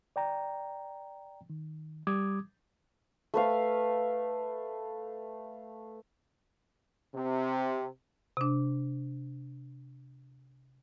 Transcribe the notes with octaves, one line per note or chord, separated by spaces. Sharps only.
D5 G5 A#5
D#3
G3 D6 D#6 G#6
A3 B4 F5
C3
C3 D4